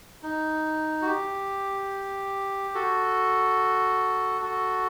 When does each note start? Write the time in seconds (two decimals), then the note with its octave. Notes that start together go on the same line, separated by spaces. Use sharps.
0.23 D#4
1.02 F#4
1.07 G4
2.75 F#4 A4
4.41 F#4 A4